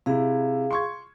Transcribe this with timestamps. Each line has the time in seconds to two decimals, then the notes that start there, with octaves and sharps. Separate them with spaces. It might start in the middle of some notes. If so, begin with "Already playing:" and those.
0.06 C3 E4 G#4 F5
0.71 C6 C#6 G#6